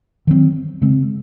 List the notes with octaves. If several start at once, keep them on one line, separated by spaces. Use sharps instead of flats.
D#3 F#3 C4
C#3 G#3 C4